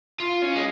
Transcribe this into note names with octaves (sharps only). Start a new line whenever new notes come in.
F4
C#4
G#3